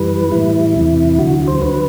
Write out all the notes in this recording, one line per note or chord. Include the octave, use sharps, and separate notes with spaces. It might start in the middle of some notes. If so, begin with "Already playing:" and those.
Already playing: F#2 E3 G3 B4
A2 E3 G3 E4
E2 C3 E3
D2 D3 F#3 F#4
C5
D3 F#3 B4